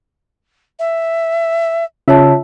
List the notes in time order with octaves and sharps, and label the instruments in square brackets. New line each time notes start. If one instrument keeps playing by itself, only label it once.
[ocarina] E5
[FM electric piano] C#3 E5 [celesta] F4 C#5 A5